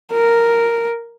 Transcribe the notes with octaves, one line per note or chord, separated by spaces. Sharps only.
A#4